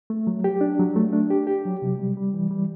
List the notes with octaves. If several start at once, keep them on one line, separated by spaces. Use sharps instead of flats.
A3
F#3
G4
D4
F#3
A3
D4
G4
G4
F#3
C3
G3
G3
E3
G3